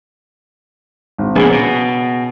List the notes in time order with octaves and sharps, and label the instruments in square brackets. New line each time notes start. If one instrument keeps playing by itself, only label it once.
[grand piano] G#1
[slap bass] A#1 A#2 [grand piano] C#3 B3 G#4
[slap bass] B2